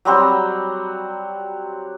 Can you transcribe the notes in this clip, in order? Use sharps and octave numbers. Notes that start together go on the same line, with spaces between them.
F#3 G3 C4 F#4